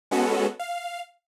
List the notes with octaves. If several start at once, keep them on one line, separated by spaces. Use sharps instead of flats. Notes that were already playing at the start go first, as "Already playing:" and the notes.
G#3 B3 C#4 F#4 A4
F5